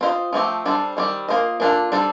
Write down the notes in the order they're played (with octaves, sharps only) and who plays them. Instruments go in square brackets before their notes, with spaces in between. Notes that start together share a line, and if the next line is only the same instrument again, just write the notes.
[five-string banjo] C4 F4 C5 D#5
F3 A3 C4 G4
G3 D4 A4 C5
D#3 G3 C4 G4
A#3 F4 C5 D#5
A#3 D4 F4 A4
G3 D4 A4 C5